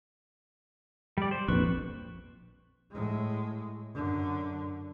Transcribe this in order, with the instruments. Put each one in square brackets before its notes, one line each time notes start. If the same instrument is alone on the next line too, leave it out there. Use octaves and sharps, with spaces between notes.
[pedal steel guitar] G3 D5
C5
[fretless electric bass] A#1 F2 [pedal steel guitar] B4 C#6
[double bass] A2 G#3
F#2 D3